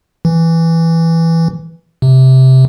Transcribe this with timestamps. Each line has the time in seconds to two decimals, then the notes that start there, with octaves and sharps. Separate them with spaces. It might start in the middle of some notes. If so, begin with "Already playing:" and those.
0.25 E3
2.02 C3